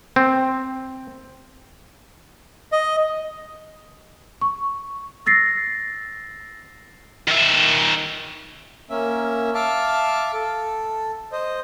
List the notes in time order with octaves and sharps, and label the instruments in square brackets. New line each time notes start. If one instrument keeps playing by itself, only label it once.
[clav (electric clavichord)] C4
[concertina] D#5
[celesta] C#6
E6 A6 A#6 C7
[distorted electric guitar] D#3 E5
[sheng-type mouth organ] A#3 C#4 E5
E5 F5 A5 D6
A4
C5 D#5